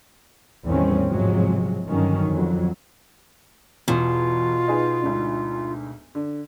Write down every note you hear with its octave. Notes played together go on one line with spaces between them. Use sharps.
A1 E2 D#3 G3 C4 C#4
G#2 C3 F3 F#3 G#3
G2 D3 D#3 F#3 C#4
F2 F#3
E2 B2 F4
D#4 G#4 B4
D2 G#2 D3
D3